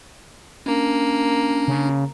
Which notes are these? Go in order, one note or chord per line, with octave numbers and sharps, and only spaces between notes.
A#3 C#4 D4
C#3